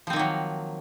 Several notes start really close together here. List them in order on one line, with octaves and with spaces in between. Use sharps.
F3 C4 D#3 A#3 F#3